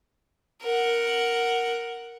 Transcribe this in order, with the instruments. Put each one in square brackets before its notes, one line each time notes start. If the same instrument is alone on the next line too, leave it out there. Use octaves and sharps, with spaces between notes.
[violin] A#4 F#5